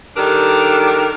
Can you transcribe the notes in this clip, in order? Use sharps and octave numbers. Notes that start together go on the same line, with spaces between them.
D#3 G3 D4 A4 A#4